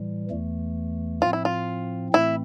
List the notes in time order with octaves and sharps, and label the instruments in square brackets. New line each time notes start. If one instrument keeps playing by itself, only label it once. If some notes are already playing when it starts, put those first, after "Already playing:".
Already playing: [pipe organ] A2 E3 G3
E2 E3 A3
[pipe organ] A2 F3 C4 [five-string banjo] F4
[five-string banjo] E4
F4
[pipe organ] A2 E3 A3 C4 [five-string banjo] E4